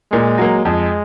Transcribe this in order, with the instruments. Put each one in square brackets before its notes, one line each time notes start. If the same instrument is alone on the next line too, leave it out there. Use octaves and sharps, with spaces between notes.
[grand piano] A#2 [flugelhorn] G#3
[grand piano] F#3 A#3
[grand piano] F2 [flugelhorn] G#3